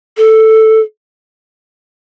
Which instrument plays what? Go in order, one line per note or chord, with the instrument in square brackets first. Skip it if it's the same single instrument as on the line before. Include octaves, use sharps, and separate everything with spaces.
[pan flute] A4